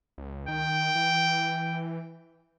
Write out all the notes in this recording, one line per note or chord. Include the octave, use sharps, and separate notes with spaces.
C#2
D#3 G5
E3